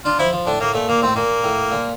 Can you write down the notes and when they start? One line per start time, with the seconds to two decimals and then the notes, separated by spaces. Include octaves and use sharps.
0.05 D4 F4
0.19 F3 E4
0.33 F3
0.46 A2 D4
0.60 A2 A#3
0.74 A#2 A3
0.88 A#2 A#3
1.02 A2 C4
1.15 A#2 A#3
1.44 A2
1.72 A#2